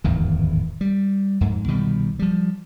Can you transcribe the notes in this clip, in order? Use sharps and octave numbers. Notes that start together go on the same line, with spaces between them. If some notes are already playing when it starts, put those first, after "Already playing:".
D1 G#1 E2 D#3
G3
F2 G#2
C2 B2 D#3 G3
F3 G3